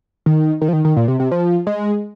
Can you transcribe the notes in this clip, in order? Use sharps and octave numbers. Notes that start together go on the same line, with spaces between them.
D#3
D#3
F3
D#3
D#3
A#2
C3
C3
F3
G#3